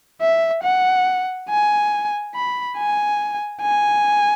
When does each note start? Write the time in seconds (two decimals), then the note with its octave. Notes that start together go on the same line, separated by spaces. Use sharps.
0.21 E5
0.63 F#5
1.49 G#5
2.35 B5
2.78 G#5
3.63 G#5